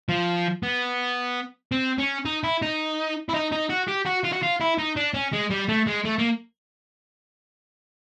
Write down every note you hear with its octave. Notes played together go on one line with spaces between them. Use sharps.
F3
B3
C4
C#4
D#4
E4
D#4
E4
D#4
D#4
F#4
G4
F#4
F4
F#4
F4
E4
D#4
D4
C#4
G#3
G3
A3
G#3
A3
A#3